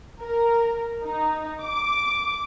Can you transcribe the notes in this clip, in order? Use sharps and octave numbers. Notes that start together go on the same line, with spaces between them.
A#4
D#4
D6